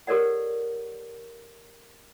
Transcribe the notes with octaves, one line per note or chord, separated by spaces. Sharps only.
G4 A4 A#4 C#5 D5 F#5